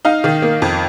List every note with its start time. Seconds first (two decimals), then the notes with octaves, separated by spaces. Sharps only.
0.05 D#4 F5
0.24 D#3
0.42 A#3
0.62 F2